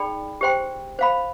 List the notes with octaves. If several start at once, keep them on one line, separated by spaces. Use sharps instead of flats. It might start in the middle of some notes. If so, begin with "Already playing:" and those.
Already playing: D#4 G#4 D5 G5 B5
G4 C5 G5 C6
C5 F5 B5